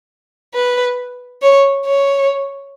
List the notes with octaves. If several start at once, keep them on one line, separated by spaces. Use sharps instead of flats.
B4
C#5
C#5